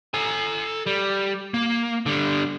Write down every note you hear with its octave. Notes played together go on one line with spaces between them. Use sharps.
A4 G#5
G3
A#3
D3 G3